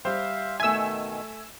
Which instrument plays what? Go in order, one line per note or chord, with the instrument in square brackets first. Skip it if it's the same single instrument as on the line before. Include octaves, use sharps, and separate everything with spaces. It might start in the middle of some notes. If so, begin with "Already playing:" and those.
[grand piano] G3 G4 C5 [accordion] E5 F5
[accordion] B2 D#3 [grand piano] A3 E5 [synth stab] G#5 E6